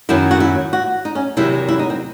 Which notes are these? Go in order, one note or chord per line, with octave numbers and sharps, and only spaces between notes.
F#2 D#3 F#3 E4
F#4
E4
F#4
D#4
C#4
E2 C3 D#3 F#3 E4
E4
D#4
C4